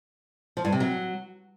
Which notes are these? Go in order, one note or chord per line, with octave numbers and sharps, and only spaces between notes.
F3
G2
C3
F#3